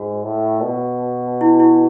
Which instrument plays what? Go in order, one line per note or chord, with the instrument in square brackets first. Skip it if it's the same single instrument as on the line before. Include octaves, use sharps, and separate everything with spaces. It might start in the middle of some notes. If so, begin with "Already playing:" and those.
Already playing: [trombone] G#2 [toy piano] F#4
[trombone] A2
B2
[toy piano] E4
E4